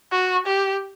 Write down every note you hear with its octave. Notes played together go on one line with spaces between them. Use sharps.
F#4
G4